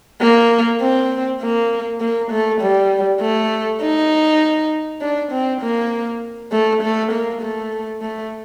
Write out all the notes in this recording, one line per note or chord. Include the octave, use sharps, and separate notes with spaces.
A#3
C4
A#3
A#3
A3
G3
A3
D#4
D4
C4
A#3
A3
A3
A#3
A3
A3